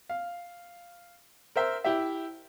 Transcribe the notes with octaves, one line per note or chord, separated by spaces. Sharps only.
F5
A#4 C5 E5
E4 G4 E5